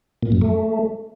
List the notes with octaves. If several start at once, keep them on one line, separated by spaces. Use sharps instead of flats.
A#2
F#2
A3